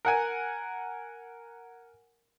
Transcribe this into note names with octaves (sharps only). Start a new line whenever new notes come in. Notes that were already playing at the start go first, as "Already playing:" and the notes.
A#4 F#5 G#5